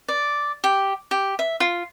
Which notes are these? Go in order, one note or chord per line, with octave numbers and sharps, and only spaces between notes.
D5
G4
G4
E5
F4